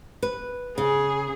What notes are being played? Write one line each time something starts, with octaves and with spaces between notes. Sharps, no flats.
B4
C#3 G#4